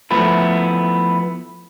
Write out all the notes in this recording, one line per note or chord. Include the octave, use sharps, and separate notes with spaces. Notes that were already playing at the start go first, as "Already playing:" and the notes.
F3 A3 B3 E4